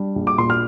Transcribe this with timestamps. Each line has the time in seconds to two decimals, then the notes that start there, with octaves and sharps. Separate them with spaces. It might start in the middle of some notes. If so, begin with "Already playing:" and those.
Already playing: G3 D4
0.16 A#1
0.27 D6
0.38 A#2 C6
0.50 F6